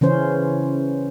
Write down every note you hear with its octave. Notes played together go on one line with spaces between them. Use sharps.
C#3 E3 C#4 C5